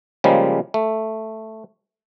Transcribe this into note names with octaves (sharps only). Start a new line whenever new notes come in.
C#3 F3 G3 G#3 A#3
A3